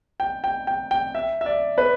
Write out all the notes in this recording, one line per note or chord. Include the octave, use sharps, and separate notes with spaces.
G5
G5
G5
G5
E5
E5
D5
B4